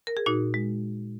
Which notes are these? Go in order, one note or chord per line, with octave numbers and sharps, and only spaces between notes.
A#4
G#4
A#2 D#4 F#4
G#3